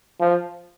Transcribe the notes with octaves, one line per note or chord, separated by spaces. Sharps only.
F3